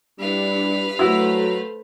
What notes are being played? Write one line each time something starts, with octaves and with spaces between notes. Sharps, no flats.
G3 D4 E4 G4 B4 F5
F#3 A3 E4 F#4 C5